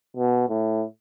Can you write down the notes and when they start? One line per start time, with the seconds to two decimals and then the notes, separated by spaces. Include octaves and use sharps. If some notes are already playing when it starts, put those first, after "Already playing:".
0.16 B2
0.49 A2